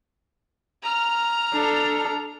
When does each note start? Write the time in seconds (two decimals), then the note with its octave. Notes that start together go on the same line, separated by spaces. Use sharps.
0.82 A#5 F6
1.53 D4 A4